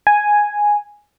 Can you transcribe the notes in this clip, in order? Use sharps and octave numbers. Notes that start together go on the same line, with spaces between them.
G#5